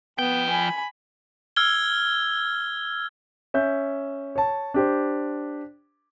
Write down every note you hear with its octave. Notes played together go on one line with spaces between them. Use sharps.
F3 B3 G5
G#5 B5
E6 F6 G#6 G7
C#4 E5 G6
C#5 A5
D4 G4 C5